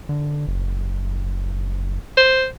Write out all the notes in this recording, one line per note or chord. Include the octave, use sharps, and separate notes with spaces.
D3
F#1
C5